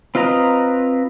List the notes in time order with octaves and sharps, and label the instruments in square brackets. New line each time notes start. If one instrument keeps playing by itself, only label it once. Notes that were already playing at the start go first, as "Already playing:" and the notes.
[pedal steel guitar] C4 F4 B4 D#5 A#5